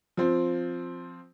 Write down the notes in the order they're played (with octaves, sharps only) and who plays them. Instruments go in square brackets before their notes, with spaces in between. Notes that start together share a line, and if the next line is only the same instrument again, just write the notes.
[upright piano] F3 C4